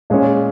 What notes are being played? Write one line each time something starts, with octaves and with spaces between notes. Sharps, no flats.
A#2 G#3 C#4